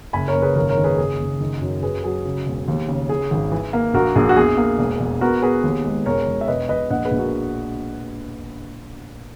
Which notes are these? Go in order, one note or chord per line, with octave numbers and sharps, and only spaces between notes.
F#1 G#5 B5
A#4 C#5
F#1
G#4 B4
G#1 A#4 C#5
A#4 C#5
D#3
G#4 B4
F#1 G#4
F#1
D#3
F#2
F#2 G#4 B4
F#3 G#4
C#3
E1
D#2
C#3
E3 G#4
G#1
E3
A#3
A#1 F#4 A#4
A#1 G#4
F#4
E2 G#4
A#3
E1
E1
B3 F#4 A#4
B3 G#4 B4
D#2
G#3
E1 A#4 C#5
E1
E5
E1 B4 D#5
E1 B4 D#5
A#1 D#5 F#5
G#4 B4
A#1
F#4 A#4